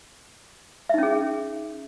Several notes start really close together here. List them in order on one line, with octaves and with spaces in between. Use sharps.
E5 D#4 C#4 G#4